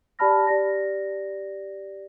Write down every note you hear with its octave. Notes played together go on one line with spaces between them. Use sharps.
G4 D5 A5 B5 F6 A#6
G4 D5 A#6